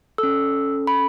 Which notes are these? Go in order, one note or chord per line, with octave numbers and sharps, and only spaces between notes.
C#4 A4 E6
B5